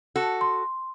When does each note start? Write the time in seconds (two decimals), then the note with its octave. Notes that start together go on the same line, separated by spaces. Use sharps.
0.16 F#4 A4
0.41 C6